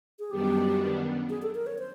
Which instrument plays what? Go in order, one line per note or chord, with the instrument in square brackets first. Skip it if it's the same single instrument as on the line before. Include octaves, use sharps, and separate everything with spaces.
[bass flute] G#4
[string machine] F#2 D#3 G3 B3 D4 [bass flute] G4
[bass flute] G#4
A4
A#4
C#5
C5